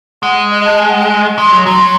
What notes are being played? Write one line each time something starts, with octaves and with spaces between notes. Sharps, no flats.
G#3 F#5
D#5
A5
G#5
F#5
G#5
G#3 C6
F#3
F#3 C6